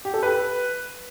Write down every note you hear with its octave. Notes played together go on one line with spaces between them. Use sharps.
G4
A4
B4